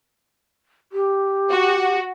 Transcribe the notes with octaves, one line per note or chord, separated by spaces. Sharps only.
G4
F#4